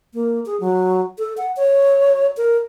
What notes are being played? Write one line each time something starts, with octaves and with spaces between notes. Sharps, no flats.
A#3
G#4
F#3
A4
F#5
C#5
A#4